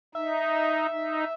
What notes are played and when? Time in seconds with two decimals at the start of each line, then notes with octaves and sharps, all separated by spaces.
0.15 D#4 E5
0.91 D#4